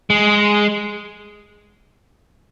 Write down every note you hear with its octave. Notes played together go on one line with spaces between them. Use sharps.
G#3